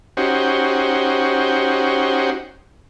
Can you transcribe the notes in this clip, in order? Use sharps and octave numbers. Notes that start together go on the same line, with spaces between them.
C#4 D#4 F#4 G4 C5